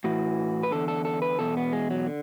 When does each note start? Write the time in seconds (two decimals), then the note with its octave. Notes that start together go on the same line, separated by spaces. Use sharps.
0.04 A2 E3 F#4
0.63 B4
0.71 E2 D3 A4
0.88 A4
1.05 A4
1.22 B4
1.39 E2 B2 A4
1.57 B3
1.73 G#3
1.91 F#3
2.07 D3